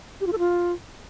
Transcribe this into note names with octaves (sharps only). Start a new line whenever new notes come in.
G4
F4
A4
F4